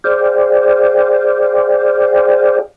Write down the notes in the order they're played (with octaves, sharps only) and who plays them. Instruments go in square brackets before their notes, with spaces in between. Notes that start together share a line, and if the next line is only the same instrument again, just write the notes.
[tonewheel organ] G#4 C5 D5 F5 G5